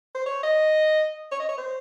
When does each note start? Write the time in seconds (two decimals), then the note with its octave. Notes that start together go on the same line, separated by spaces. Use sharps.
0.15 C5
0.26 C#5
0.43 D#5
1.31 C#5
1.40 D#5
1.49 C#5
1.58 C5